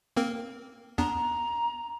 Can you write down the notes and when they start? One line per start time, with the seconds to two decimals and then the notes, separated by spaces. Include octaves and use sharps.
0.17 A#3 C4 A#4
0.98 E2 B3 D4 A#5